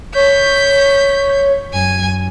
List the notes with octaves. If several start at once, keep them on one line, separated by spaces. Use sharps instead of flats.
C#5 G6 B6
F#2 G#5